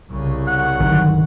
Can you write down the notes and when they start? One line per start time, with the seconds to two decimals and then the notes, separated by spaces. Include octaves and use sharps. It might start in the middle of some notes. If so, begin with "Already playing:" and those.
0.11 C2 C#3
0.48 F#5
0.80 G1 D#3 F#3